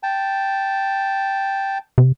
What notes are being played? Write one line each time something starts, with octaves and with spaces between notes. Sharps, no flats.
G5 A5
C3